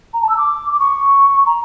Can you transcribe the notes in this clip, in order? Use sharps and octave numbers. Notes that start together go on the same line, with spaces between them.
A#5
A5
E6
D6
D6
C#6
A#5